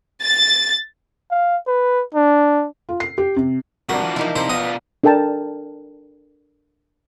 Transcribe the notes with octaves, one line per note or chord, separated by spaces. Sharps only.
A6
F5
B4
D4
F4
C7
G4
C3
G2 C3 D4 F#4 A#4
E3 F3
A#3 D#4 E4
C3 C5
B2 B3 F4 D#5
D4 A4 A#4 G5 A5